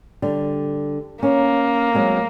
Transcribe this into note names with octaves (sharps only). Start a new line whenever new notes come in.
D3 G3
A#3 C#4
F#3 G#3 C4